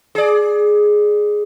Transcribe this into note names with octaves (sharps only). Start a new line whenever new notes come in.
G#4 D5